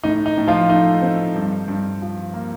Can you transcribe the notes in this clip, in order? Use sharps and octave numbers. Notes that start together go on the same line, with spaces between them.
A2 D#4
D#4
A2
F3 F4
A3 D#4
C4
G2
G2
F3
A#3